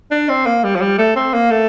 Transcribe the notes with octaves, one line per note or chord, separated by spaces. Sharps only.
D4
C4
A#3
G3
F3
G3
A3
C4
A#3
A3